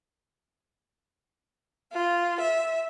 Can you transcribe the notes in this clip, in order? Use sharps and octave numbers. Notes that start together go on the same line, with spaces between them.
F4
E5